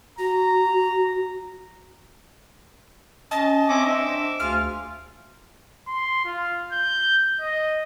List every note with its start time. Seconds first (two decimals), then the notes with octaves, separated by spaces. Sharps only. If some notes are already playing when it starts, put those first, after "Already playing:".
0.19 F#4 A#5
3.31 C#4 D#5 A5
3.69 C4 C#4 E5 G#5 D6
3.86 C4 D4 E5 D6
4.40 D2 F4 G#4 F6
5.88 C6
6.25 F4
6.72 G6
7.41 D#5